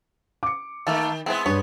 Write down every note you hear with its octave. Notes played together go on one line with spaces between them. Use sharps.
D6 C#7
D#3 A3 A#3 A4
G#3 B3 C4 E4 G#4
G2 C#5